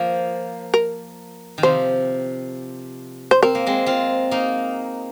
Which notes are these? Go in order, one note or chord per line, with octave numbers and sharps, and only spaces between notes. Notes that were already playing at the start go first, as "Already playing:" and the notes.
Already playing: F3 A#3
A#4
D#3
C3 F3 C5
C5
C4 A#4
A#3
G#3 C4
C4 F4
A#3 D#4